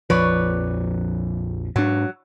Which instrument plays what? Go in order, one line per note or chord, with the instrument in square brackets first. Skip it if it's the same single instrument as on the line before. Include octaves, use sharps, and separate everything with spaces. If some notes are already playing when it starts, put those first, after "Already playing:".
[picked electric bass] A#1 F2 F3 [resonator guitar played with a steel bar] B4 C#5 D5
[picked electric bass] G#2 D4 [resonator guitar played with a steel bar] F#3